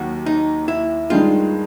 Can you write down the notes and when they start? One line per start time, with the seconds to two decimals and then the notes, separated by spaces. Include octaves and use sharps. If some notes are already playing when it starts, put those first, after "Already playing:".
Already playing: D#2 F#3 F#4
0.26 D#4
0.68 E4
1.10 G2 D#3 G#3 F4